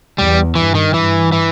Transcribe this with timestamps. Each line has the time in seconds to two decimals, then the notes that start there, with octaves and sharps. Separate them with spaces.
0.17 E2 G3
0.55 G2 E3
0.75 D#3
0.94 G2 E3
1.32 E3